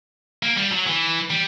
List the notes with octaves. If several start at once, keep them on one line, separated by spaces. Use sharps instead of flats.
A#3
G3
F#3
E3
G3